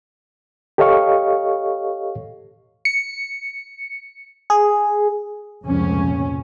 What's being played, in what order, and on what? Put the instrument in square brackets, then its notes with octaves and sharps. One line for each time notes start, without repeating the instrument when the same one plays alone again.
[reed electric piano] G4 A4 C#5 D#5 F5 C#6
[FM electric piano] C#7
G#4
[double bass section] F1 C#2 A#2 F3 C#4